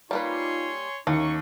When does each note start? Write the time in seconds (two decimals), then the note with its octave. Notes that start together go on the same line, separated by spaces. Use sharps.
0.11 G3 A#3 D#4 F4 B4 C#5 G#5 C6
1.07 D#2 A#3 C#4 D#4 E4 C#6